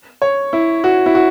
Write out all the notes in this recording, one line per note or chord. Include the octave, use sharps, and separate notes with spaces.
C#5
E4
F#4
E4
F#4